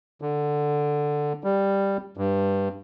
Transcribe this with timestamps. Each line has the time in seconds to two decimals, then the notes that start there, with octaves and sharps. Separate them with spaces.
0.22 D3
1.44 G3
2.17 G2